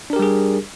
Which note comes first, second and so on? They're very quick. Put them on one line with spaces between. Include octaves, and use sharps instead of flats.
D4 A#4 G4 G3 G#4